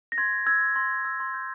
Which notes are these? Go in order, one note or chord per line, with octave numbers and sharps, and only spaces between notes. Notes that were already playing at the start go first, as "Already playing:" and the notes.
A#6
C6 G#6
G6
E6 G#6
C6
C6 A#6
G6
E6
C6
G6